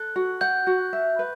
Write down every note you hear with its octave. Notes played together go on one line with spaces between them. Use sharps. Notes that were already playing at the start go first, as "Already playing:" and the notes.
Already playing: A4 F#6
F#4
F#5 G6
F#4
E5
B4